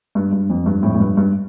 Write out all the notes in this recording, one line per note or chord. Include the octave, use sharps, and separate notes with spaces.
G2
G2
F2
G2
F2 A2
A2
G2
G2